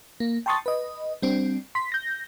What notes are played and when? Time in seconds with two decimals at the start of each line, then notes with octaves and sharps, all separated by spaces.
0.20 A#3
0.46 G5 A5 C6 C#6 D#6 A6
0.66 B4 D#5
1.22 G3 C4 D4
1.75 C6 B6
1.92 G6 A#6